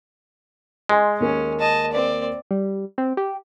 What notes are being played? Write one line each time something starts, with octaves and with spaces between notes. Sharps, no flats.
G#3 D#5 G#5 C6
D#2 A#3 C#4
D#5 A5
C4 D5
G3
C4
G4